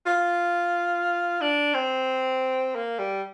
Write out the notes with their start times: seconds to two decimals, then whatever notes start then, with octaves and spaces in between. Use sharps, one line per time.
0.06 F4
1.41 D4
1.74 C4
2.75 A#3
2.99 G3